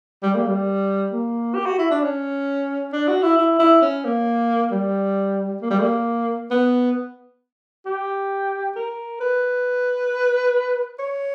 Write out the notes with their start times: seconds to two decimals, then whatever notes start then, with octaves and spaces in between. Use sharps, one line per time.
0.23 G3
0.35 A#3
0.47 G3
1.13 A#3
1.55 G4
1.66 F#4
1.79 E4
1.91 D4
2.03 C#4
2.93 D4
3.08 F#4
3.23 E4
3.38 E4
3.59 E4
3.82 C#4
4.05 A#3
4.72 G3
5.62 A#3
5.71 G3
5.79 A#3
6.51 B3
7.86 G4
8.76 A#4
9.21 B4
10.99 C#5